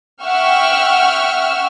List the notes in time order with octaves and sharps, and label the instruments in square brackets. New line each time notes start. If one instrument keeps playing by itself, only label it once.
[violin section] E5 F#5 G5 C#6 E6 F6